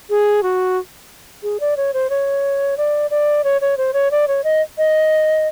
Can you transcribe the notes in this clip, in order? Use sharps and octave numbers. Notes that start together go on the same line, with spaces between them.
G#4
F#4
G#4
D5
C#5
C5
C#5
D5
D5
C#5
C#5
C5
C#5
D5
C#5
D#5
D#5